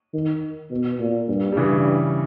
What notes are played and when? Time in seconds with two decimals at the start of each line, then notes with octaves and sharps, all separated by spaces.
0.14 D#3
0.71 B2
1.00 A#2
1.28 G2
1.53 G3
1.57 G2 C#3 E3